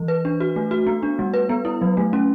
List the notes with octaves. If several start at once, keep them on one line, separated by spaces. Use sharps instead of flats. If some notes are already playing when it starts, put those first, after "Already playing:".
Already playing: E3
B4
D4
F#4
A3
F#4
B3
D4
G3
B4
B3
E4
F#3
A3
C#4